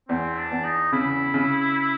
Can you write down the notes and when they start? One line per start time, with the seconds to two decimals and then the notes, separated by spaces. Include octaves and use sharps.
0.09 E2 C4
0.38 D4
0.51 E2
0.65 D#4
0.93 C#3 E4
1.34 C#3